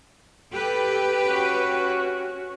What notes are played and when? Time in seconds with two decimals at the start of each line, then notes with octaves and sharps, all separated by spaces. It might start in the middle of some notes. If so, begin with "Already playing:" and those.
0.54 G4 A4 B4
1.27 C#4 F#4